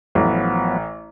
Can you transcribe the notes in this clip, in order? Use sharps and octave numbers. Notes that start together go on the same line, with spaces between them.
A1 F3 F#3 B3